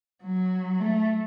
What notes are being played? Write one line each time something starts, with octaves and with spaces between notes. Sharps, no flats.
F#3
A3